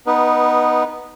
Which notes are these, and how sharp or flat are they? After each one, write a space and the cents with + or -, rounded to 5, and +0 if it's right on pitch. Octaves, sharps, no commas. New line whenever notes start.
B3 +0 D#4 +0 B4 -20